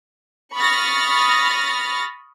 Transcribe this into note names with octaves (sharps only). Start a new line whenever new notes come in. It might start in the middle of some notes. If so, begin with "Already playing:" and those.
B5 C#6 D#6 F6 A6 A#6